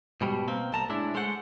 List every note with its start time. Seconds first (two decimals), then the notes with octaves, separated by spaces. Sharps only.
0.21 G#2 B2 G3
0.48 B2 A#3 C4
0.73 C2 A5 A#5
0.89 A2 G#3 D4 E4
1.15 G#3 A3 C5 F#5